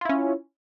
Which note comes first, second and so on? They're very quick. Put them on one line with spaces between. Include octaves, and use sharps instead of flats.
F4 E4 C#4